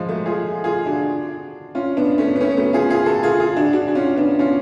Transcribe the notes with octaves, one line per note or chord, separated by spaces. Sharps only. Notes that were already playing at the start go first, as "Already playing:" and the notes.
Already playing: F3 G#3
F#3 A3
F4 G#4
F4 G#4
D4 F#4
C#4 F4
B3 D4
A3 C#4
B3
A3 C#4
B3
F#3 A3
F4 G#4
F4 G#4
F#4 A4
F4 G#4
F4 G#4
D4 F#4
D4 F#4
F#4
C#4 F4
B3 D4
C#4 F4